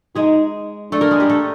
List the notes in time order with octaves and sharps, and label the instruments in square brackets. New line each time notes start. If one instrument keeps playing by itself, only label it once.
[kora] G#3 G#4 [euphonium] D#4
[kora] A3 A4 [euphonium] D4
[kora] A#3 A#4
G#3 G#4
G3 G4
A3 A4